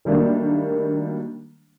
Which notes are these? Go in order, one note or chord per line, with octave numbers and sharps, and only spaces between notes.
D#3 F#3 G3 A3 A#3 D4